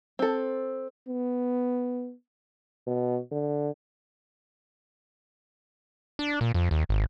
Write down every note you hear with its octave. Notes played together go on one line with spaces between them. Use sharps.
C4 A4
B3
B2
D3
D4
A#2
F2
D#2
G#1